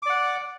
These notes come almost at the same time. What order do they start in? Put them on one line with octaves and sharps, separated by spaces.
D6 D5 F#5